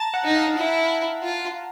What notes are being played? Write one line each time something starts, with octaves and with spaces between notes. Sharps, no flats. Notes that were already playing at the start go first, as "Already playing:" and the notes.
Already playing: A5 A#5
F#5
D#4
F5
E4
F4